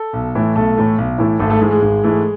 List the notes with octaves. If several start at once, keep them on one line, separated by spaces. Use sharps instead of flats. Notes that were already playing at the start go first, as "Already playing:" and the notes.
Already playing: A4
B1
A2 E3 A3
B1 A3 A4
A2 E3 A3
B1
A2 E3 A3
G#1 A3 A4
A3 A4
G#2 E3 G#3 A3 G#4
G#3 G#4
G#1
G#2 E3 A3